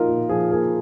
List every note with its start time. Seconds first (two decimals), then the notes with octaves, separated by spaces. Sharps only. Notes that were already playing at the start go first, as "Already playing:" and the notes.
Already playing: F3 A#3 D#4 F4 A#4 F5
0.08 A#2
0.29 F3 G#4
0.51 A#3 G#4